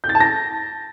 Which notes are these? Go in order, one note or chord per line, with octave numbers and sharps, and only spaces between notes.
G6
A6
A5
A#6